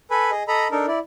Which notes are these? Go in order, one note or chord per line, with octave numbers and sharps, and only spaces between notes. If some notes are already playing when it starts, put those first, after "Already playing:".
A4 B4 G#5 B5
G#4 D#5
A4 D#5 A#5 B5
D4 D#4 A4 A#4
E4 D5